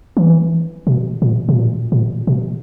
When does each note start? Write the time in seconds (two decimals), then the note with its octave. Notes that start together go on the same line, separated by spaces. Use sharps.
0.17 E3
0.87 B2
1.22 A#2
1.49 B2
1.57 A#2
1.92 A#2
2.27 B2